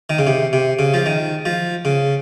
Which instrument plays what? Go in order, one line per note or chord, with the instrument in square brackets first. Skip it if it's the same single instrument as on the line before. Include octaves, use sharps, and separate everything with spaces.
[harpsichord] D#3
C#3
C3
C3
C#3
F3
D#3
F3
C#3